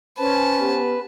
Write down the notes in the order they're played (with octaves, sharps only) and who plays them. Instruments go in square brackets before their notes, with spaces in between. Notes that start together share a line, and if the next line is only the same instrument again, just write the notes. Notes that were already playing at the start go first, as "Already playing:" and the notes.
[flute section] C#4 C5 [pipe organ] B4 [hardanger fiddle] A5
[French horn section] B3 G4